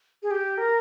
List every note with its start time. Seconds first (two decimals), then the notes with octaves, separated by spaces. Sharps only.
0.23 G#4
0.31 G4
0.57 A#4